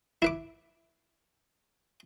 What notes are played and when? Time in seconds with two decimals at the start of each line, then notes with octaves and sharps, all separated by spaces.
0.22 E4 B4 D6